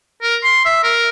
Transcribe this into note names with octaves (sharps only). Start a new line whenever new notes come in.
A#4
C6
E5
A#4